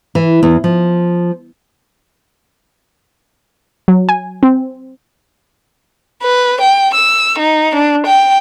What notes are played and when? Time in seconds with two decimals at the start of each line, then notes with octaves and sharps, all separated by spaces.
0.15 E3
0.43 E2
0.64 F3
3.88 F#3
4.09 G#5
4.43 C4
6.23 B4
6.61 G5
6.95 E6
7.39 D#4
7.75 D4
8.07 G5